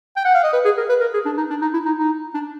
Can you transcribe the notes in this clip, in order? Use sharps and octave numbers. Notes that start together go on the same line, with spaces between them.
G5
F#5
F5
D#5
B4
G#4
A#4
B4
A#4
G#4
D4
D#4
D4
D#4
E4
D#4
D#4
D4